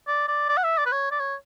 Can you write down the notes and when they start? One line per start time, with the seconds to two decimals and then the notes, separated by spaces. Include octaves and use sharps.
0.07 D5
0.28 D5
0.49 D5
0.57 F#5
0.63 E5
0.78 D5
0.86 B4
0.92 C#5
1.11 D5
1.20 C#5